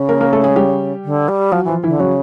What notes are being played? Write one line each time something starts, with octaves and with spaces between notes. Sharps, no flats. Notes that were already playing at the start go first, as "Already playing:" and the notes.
Already playing: C#3
A#3 A#4
A#3 A#4
A3 A4
G#3 G#4
G3 G4
D3
G3
F3 F#3 F#4
E3 F3 F4
D3 E3 E4
C#3 F#3 F#4